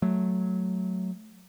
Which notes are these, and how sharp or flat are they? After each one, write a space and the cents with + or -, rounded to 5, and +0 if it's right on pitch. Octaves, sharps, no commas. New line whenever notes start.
F#3 +0 A3 -10